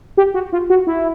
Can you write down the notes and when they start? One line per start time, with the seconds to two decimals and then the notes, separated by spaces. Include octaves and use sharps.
0.17 G4
0.34 F#4
0.52 F4
0.70 F#4
0.87 E4